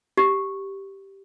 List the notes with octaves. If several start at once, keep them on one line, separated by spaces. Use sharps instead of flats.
G4